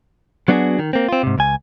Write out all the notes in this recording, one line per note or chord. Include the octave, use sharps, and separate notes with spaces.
F#3 B3 D4 F4 F#4 G#4
D#3
A#3 C4
C4 F4
G#2 C3
C#2 G#5